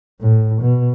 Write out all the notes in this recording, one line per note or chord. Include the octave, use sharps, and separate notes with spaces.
A2
B2